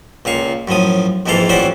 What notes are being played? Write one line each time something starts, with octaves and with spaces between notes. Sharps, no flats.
C#2 A#2 F5 C#6
F#2 A2 F3 D#6
A#1 F2 G#2 E3 A4 F5
A1 F2 C#4 C5 D5 F#5